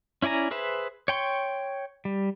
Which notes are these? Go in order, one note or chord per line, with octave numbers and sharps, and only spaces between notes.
C#4 E4 D5 G#5 A#5
G#4 B4 C5 E5
C#5 G5 C6 C#6
G3